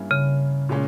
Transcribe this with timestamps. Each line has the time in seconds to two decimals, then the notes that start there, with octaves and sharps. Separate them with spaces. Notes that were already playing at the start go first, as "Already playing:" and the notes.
Already playing: G2 G3 A#3 C#4 E4
0.11 C#3
0.69 A#2 G#3 C#4